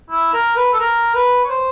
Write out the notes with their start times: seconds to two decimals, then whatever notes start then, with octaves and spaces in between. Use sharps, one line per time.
0.10 E4
0.33 A#4
0.56 B4
0.73 A4
0.80 A#4
1.14 B4
1.44 C#5
1.50 C5